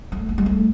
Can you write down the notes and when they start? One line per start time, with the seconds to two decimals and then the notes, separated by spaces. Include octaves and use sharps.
0.12 A3
0.29 A#3
0.38 G#3
0.46 A3